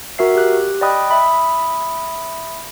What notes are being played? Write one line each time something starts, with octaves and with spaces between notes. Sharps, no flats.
F#4 A#4 E5 C7
G4 F#6
D5 D#5 G5 B5 D#6 F#6
E5 B5 D#6